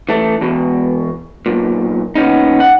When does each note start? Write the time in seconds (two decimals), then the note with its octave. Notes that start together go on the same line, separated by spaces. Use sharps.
0.09 E3 A3
0.41 E2 B2
1.46 B1 A#2
2.15 D#2 B3 C#4 D#4
2.60 F#5